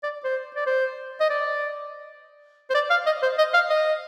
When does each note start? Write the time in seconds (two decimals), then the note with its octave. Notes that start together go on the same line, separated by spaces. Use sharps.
0.03 D5
0.24 C5
0.56 D5
0.66 C5
1.20 D#5
1.30 D5
2.70 C5
2.74 D5
2.90 F5
3.06 D#5
3.22 C5
3.38 D#5
3.54 F5
3.70 D#5